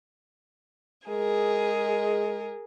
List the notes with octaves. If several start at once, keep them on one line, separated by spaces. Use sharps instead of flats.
G#3 G#4 A#4